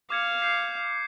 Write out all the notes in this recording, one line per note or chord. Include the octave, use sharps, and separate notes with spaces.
F5 D6 G#6 C#7
G6 C7